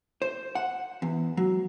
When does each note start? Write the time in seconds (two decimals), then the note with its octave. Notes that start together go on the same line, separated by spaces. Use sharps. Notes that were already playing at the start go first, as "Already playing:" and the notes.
0.22 C5
0.55 F#5
1.02 E2
1.37 F#3